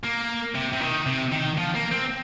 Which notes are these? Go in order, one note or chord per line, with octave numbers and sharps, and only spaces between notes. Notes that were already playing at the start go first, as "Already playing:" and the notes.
A#3
C3
C3
D#3
C3
D#3
F3
A#3
C4